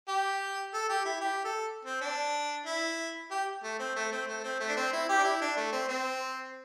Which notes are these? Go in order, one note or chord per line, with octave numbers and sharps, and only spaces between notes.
G4
A4
G4
E4
G4
A4
C4
D4
E4
G4
A3
C4
A3
C4
A3
C4
A3
D4
C4
E4
G4
D4
E4
D4
A3
C4
C4